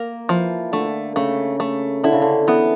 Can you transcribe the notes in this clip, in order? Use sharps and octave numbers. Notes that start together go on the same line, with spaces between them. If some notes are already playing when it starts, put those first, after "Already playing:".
Already playing: A#3 A#4
E3 F3
D3 A3
C#3 A3
A3
D3 E4
C#3
D3
E3 B3